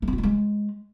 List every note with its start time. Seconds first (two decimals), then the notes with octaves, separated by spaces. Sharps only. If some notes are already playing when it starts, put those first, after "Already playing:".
0.02 A3
0.08 B3
0.13 F4
0.18 A3
0.23 G#3